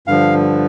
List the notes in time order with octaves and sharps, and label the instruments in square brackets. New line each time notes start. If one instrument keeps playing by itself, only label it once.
[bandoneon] G2 D3 F3 F5